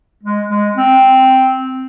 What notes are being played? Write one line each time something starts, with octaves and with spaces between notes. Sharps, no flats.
G#3
G#3
C4